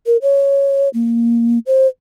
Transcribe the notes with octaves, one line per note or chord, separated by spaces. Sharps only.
A#4
C#5
A#3
C5